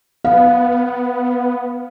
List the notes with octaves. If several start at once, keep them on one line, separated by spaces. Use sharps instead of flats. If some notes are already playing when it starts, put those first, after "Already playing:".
B3 F5